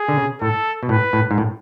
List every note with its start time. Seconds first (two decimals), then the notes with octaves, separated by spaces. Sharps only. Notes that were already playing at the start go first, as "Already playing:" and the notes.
Already playing: G#4
0.08 D3
0.17 C#3
0.41 A2 A4
0.83 B2
0.89 A2 B4
1.13 A2
1.31 G#2
1.38 A2